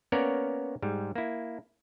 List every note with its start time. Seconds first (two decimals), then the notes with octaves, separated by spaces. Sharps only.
0.12 A#3 B3 C#4 A#4 C#5 D5
0.82 G#2 G3
1.15 A#3 E4